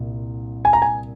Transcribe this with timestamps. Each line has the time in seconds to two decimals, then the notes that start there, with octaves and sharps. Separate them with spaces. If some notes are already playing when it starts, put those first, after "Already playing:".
Already playing: C2 A#2
0.65 G#5
0.73 A#5
0.82 G#5